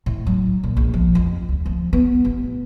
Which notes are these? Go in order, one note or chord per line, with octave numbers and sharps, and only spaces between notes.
A2
F#3
A#2
A#1
F3
F2
D2
F3
B3
A1